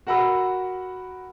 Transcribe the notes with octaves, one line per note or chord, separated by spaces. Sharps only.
F#4 A#4 F#5 B5 E6